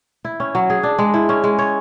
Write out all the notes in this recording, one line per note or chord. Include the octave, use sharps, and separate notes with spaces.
E4
C#4
F#3
G#4
D4
G#3
E4
C#4
G#3
C#5